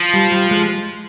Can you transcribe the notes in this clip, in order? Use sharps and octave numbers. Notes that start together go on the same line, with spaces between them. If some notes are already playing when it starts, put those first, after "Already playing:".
Already playing: F3
G3
G3
G#3